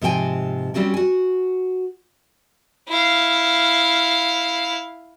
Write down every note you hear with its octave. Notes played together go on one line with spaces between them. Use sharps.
G#2 C3 F3 A#4 G5 G#5
G3 C4 C#4 F#4 G4
F#4 G#5
E4 F5